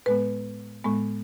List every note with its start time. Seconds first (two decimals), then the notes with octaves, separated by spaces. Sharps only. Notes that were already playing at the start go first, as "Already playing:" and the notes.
0.06 A2 G#3 B3 B4
0.84 A2 G#3 B3